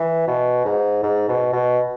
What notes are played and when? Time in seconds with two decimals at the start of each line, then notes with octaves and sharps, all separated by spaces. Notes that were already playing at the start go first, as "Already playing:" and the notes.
Already playing: E3
0.27 B2
0.65 G#2
1.03 G#2
1.29 B2
1.53 B2